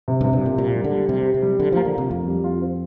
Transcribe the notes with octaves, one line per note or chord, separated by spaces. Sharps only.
C3
G2
C3
G2
A#2 G4
A#2 G3
G3
D3
G3
C3 G3
G4
C3
G3
D3 G3
F3 A#3
D3
C3 F4
F2 A#3
G3
F4
C4